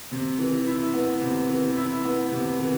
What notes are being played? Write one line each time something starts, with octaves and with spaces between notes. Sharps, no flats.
C3
E3
E4
B3
C3
E3
E4
B3
C3
E3